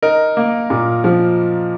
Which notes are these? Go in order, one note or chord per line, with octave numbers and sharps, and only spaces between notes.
D#4 A#4
A#3
A#2
F3